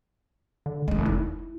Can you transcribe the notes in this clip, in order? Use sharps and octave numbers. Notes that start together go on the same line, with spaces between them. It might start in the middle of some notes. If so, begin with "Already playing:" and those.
D3
F1 D#2 G#3
D#4 E4